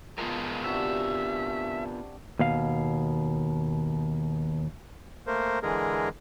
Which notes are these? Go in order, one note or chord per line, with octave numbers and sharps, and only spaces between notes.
F3 G#3 B3 F4 A#4
C3 D4 F#4 E5
D#2 B2 F5
A3 A#3 A#4 C5
D3 E3 G#3 G#4 A#4